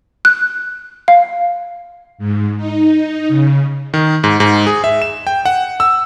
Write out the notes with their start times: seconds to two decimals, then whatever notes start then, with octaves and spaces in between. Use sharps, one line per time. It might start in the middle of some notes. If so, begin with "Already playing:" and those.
0.25 F#6
1.08 F5
2.18 G#2
2.57 D#4
3.29 C#3
3.94 D#3
4.24 G#2
4.40 G#2
4.67 G#4
4.84 E5
5.02 E7
5.27 G5
5.45 F#5
5.80 E6